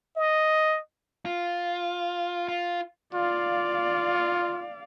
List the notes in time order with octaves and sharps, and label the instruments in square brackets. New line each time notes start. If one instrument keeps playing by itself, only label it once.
[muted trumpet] D#5
[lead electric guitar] F4
F4
[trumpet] F4 [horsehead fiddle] D5 F5